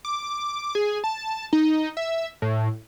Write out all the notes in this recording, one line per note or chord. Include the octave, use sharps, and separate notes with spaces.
D6
G#4
A5
D#4
E5
A2